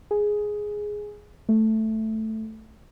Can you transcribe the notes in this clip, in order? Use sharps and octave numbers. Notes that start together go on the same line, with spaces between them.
G#4
A3